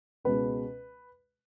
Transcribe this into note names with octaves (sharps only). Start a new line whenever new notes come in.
C#2 B2 G#3 B4